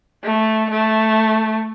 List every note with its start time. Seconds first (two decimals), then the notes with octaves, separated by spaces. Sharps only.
0.24 A3
0.71 A3